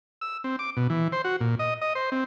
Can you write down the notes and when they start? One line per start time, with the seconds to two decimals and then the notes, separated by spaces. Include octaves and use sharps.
0.21 E6
0.44 C4
0.59 D6
0.77 B2
0.90 E3
1.12 C5
1.24 F#4
1.41 A#2
1.59 D#5
1.82 D#5
1.95 C5
2.12 C4